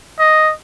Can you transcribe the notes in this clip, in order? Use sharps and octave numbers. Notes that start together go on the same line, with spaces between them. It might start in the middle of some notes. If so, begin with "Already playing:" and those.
D#5